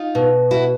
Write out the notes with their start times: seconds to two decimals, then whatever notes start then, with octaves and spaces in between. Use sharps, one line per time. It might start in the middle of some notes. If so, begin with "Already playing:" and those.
Already playing: D#4 F4
0.15 B2
0.51 E4 F#4